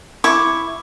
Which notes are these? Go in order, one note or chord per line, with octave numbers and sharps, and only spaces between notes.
E4 C#6 D6